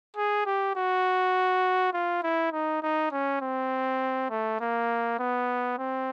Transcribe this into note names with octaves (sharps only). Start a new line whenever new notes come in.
G#4
G4
F#4
F4
E4
D#4
D#4
C#4
C4
A3
A#3
B3
C4